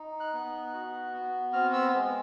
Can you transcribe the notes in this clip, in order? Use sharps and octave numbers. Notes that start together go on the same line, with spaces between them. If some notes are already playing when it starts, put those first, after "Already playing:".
Already playing: D#4
F#6
B3
F#4
B3
C4 F6
E6
G#3